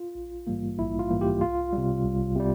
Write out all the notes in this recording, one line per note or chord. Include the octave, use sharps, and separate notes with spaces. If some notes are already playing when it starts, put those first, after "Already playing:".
Already playing: F4
A#1
G#2 E3 G3 A#3
A#1 E4
F4
G#2 E3 G3 A#3
G4
C2 F4
C3 G3
C2
C3 G3